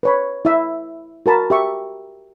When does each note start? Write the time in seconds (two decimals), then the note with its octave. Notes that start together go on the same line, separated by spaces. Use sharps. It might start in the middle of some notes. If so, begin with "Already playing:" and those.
0.03 B4 C#5 B5
0.45 E4 E5
1.26 F#4 A#4 A5 B5
1.50 G4 E5 C#6